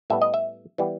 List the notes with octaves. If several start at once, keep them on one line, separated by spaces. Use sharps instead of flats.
A2 G3 B3 E5
D#5
E5
E3 G3 B3